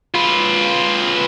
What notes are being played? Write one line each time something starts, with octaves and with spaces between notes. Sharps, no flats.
F4 B4